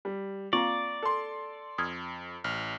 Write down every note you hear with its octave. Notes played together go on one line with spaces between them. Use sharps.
G3
A#3 C4 F4 D5 F5 A#5 C#6
A4 C6
F2 D#6 F6 G#6
A1 F6